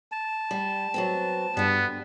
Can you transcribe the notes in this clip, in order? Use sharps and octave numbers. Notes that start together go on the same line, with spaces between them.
A5
G3
F#3 B3 C4
G2 D3 G3 B3